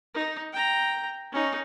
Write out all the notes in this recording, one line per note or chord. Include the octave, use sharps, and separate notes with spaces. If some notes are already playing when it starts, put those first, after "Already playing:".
D#4
G5 A#5
C#4 D#4